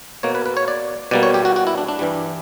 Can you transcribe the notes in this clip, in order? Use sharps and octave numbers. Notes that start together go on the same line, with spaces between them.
B2 A#3 C#5
B4
B4
C#5
D5
B2 G3 A#3 D5
C#5
G4
F#4
F#4
E4
D4
D4
G2 E3 G3